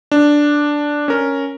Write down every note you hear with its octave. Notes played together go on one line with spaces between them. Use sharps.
D4
C#4 A#4